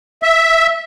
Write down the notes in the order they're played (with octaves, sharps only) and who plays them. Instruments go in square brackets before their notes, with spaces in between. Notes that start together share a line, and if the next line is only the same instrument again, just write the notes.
[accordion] E5